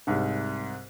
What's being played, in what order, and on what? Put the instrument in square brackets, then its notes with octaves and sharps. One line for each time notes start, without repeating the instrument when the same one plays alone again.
[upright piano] C2 G#2